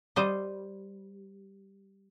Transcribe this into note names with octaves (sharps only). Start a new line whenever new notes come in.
G3 C5 D#5